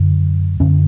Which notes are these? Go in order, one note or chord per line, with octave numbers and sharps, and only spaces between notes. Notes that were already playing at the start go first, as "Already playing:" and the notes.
Already playing: F#2 D3
F#2 D3 C#4